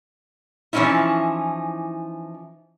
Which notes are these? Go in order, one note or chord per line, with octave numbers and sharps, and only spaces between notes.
E3 F3 C4 C#4 D#4 E4